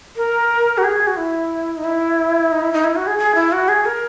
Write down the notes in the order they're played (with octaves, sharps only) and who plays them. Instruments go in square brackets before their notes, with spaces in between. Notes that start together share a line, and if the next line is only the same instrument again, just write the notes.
[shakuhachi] A#4
F#4
G#4
F#4
E4
D#4
E4
D#4
E4
D#4
E4
F#4
G#4
G#4
E4
F#4
G#4
A#4